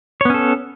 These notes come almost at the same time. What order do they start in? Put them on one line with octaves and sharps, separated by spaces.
C#5 B3 C#4 A4